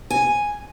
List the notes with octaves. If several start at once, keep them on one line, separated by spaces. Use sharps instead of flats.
G#5